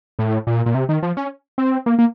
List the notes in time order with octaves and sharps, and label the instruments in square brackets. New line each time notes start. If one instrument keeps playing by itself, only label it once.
[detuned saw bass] A2
A#2
A#2
C3
D#3
F3
C#4
C4
A#3
A#3